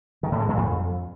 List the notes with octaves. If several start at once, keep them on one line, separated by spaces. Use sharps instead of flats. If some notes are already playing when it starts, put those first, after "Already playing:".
D#3
A2
G#3
A#2
F2